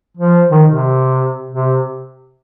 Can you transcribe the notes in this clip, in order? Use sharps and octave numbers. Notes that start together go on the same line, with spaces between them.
F3
D#3
C3
C3